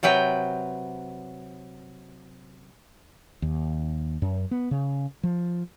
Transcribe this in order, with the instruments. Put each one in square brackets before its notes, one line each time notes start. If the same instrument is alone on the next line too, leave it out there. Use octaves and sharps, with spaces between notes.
[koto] C3 F#3 B4 G5
[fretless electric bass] D#2
F#2
B3
C#3
F3